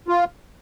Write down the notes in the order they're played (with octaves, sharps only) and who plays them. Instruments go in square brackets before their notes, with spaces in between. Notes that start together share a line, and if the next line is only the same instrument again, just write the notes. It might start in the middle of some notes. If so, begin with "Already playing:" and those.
[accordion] F4